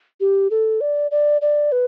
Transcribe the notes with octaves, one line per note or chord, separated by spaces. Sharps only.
G4
A4
D5
D5
D5
B4